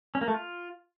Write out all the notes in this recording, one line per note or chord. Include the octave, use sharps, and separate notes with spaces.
C#4
A#3
A3
F4